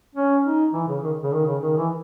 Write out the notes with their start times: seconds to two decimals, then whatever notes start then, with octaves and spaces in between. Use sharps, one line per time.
0.15 C#4
0.44 D#4
0.73 E3
0.88 C#3
1.03 D#3
1.23 C#3
1.32 D#3
1.46 C#3
1.62 D#3
1.77 E3